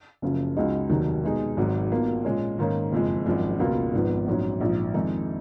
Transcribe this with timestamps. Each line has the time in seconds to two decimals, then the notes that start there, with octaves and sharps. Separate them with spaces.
0.22 F#1 F#2 C#3 F3
0.57 C#2 C#3 G#3 D#4 F#4
0.90 F1 D#2 D#3 F#3
1.23 B2 G#3 D#4 G#4
1.57 G#1 G#2 F#3
1.91 B1 B2 A#3 F4
2.25 A#2 G#3 C#4
2.59 G#2 D#3 A#3 C#4
2.92 F#1 F2 F3 G#3
3.26 G#1 F#2 F3 G#3
3.59 C#2 B2 A#3 F4
3.93 G#1 G#2 F3 B3
4.27 A#1 G#2 F#3 C#4
4.61 A#1 G#2 F3
4.94 F2 D#3 G#3 D#4